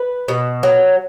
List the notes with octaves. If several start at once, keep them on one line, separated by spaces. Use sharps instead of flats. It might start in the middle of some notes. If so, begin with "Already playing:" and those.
Already playing: B4
B2
F#3